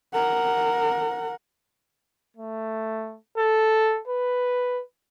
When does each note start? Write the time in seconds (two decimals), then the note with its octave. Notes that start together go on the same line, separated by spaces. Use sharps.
0.14 A#4 F#5
2.37 A3
3.38 A4
4.08 B4